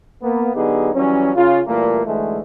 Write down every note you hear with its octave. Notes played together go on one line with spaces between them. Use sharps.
A#3 B3
D3 F#3 B3 D#4 G4 G#4
E3 F#3 G3 C#4
C#3 F4
A#2 E3 G3 A3 A#3
D2 G#2 E3 G#3 A3